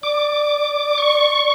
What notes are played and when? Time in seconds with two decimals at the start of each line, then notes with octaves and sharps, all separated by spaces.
0.03 D5 D6
0.98 C#6